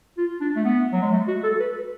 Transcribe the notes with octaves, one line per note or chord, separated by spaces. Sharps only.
F4
D4
A3
B3
F#3
G#3
A3
F#4
A4
B4